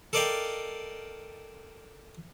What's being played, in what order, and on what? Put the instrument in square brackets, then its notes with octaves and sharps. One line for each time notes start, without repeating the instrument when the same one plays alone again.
[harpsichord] A4 A#4 D5 D#5 F5 G5